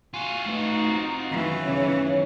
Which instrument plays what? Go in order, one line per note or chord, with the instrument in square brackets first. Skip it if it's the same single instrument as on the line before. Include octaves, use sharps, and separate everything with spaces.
[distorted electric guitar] F4 F#4 [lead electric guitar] G#5
[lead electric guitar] A3 B4 [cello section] D#4
[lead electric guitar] C4
[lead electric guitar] F#2 D#3 [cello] E3
[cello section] C#3 C#5